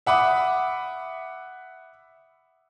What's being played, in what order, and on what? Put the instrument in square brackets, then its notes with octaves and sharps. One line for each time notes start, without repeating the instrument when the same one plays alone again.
[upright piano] E5 F#5 B5 D6 D#6